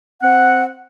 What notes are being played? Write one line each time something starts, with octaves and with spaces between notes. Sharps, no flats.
C4 F#5